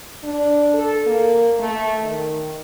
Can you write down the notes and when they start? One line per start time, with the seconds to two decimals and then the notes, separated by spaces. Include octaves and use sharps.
0.24 D4
0.74 A4
1.07 A#3
1.59 A3
2.01 D#3